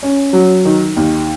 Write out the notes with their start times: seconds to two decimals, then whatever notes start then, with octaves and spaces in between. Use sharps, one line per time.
0.03 C#4
0.33 F#3
0.65 D#3
0.97 D#2